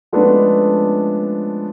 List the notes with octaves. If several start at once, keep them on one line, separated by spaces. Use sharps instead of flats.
F3 G#3 A3 B3 C#4 D4